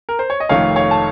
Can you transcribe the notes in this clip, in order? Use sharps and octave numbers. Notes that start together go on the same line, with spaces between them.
A#4
C5
C#5
D#5
F1 F2 D#3 A3 C#5 F5
C#5 F5
A5